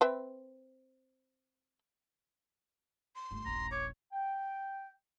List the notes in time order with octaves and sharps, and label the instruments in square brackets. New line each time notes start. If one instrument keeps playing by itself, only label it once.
[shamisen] C4 B4 E5
[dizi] C6
[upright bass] G1 A3
[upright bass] D#1 A#1 [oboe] A#5
[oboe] C#5 [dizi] D6
[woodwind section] G5